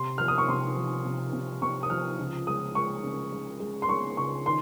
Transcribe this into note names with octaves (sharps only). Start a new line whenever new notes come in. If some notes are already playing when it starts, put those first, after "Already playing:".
Already playing: C3 C6
F3 F6
D#6
C#6
C3 C6
F3
C3
C3
C3 C#6
D#6
F3 F6
C#2
G#3 D#6
G#3 C#6
C#3
G#3
G#3
C6
G#3 C#6
C#2 C#6
D#3 C6